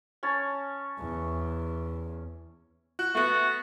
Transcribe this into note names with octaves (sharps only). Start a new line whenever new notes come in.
C#4 C#5 A5
E2
F#4
A3 B3 F#4